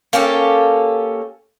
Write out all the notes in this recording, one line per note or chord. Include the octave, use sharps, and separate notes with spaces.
A#3 C#4 G4 A4